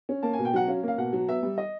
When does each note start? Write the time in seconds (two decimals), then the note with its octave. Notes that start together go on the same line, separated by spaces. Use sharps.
0.09 C#4
0.23 A#3 A5
0.33 G#5
0.38 B2
0.45 G5
0.53 F#3 F#5
0.68 C#4 F5
0.83 A#3 F5
0.98 B2 F#5
1.13 F#3
1.28 B3 E5
1.43 G3
1.58 D#5